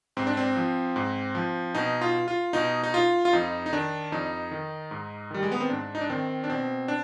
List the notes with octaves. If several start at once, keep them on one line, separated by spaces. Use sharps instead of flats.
G#2 C4
D4
C4
F3
G#2
F3
B2 D#4
F4
F4
B2 D#4
D#4
F4
F4
F2 D#4
D#4
D#3 D4
F2 D#4
D#3
G#2
D#3 G3
G#3
B3
C4
G#2 D4
D#4
D4
D#3 C4
D4
B2 C4
D4